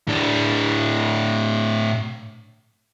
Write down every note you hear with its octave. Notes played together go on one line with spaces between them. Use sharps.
A2 D4